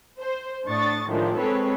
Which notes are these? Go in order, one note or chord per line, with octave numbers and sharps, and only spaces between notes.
C5
A2 D4 C#6 D#6 A6
A2 D#3 F3 G#3 D4
G#3 C4 A4 B4 C#5